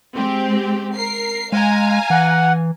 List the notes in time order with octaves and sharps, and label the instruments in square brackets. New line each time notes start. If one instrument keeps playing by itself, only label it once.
[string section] G#3 C4 G4
A#4 C7
[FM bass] G#3 [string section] F5 G#5 A#5
[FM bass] E3 [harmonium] F#5